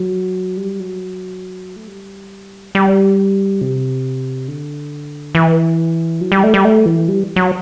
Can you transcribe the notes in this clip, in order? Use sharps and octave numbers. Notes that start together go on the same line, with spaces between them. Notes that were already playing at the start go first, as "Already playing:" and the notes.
Already playing: F#3
G3
F#3
A3
G3
G3
C3
D3
E3
F#3
G3
A3
G3
A3
E3
G3
F#3